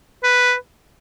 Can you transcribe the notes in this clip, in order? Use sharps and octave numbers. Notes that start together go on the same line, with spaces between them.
B4